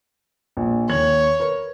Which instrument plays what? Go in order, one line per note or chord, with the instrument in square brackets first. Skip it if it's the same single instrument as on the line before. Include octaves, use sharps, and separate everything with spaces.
[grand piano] A#1
[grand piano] D#2 G#6 F#7 [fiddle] C#5
[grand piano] A#4 B4